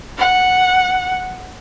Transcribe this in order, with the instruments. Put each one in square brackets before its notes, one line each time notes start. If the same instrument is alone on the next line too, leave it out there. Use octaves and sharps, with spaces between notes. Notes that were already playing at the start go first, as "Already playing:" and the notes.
[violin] F#5